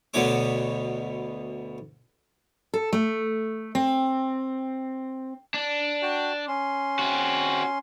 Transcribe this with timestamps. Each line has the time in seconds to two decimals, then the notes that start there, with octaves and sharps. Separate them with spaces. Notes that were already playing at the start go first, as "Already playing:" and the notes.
0.14 D2 B2 D3 B3 C#5 D6
2.74 A4
2.93 A3
3.75 C4
5.54 D4
6.02 F#4 G5 A5
6.48 C#4 C6
6.99 C4 F#4